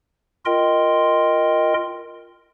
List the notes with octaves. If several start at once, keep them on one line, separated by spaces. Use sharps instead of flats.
F4 A#4 D#5 G5 C6